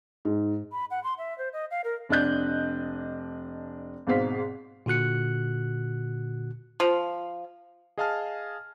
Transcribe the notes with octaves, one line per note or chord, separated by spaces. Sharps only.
G#2
B5
F#5
C6
E5
C5
D#5
F5
A#4
F1 D4 D#5 F#6 G6
G#1 G#2 B2 C5 F5 B6
A#2 D3 F#4 F#6 C#7
F3
G#4 D#5 F5 G#5 A5 F6